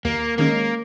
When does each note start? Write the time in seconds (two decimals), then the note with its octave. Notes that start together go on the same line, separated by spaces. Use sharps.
0.05 D#2 A#3
0.38 D#3 G#3 A#3 C#4